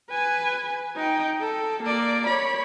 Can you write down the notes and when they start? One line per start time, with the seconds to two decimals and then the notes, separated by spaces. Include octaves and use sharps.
0.10 B4 G#5
0.96 D#4 G5
1.41 A4
1.83 A#3 D5
2.27 C#5 B5